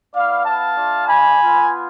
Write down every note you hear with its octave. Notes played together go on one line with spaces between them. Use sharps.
B3 E4 D5 F5
F5 A5
A3 D4 F4
G#5 B5
B3 F4